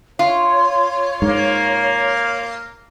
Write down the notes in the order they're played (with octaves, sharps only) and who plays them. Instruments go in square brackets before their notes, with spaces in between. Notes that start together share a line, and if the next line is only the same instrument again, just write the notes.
[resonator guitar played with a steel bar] F4 [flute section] C#5
[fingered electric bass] G#2 [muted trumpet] A#3